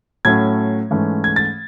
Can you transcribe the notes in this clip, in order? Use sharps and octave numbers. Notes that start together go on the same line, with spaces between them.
A2 F#3 A3 C#4 G#6
G#2 E3 A3 C#4
G#6
A6